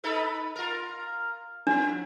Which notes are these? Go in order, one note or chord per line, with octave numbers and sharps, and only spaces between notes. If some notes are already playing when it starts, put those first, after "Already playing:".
D#4 A4 B4
F4 A#4
F3 D4